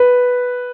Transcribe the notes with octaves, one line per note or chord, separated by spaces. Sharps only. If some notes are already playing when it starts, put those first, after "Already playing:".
Already playing: B4